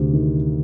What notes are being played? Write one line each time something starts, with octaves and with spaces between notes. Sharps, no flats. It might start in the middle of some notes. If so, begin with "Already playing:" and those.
Already playing: D2 C3
D#3